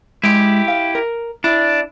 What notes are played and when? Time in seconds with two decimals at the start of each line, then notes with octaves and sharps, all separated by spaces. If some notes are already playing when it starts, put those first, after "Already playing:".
0.24 G#3 E4 G4
0.68 F5
0.95 A#4
1.44 D4 E4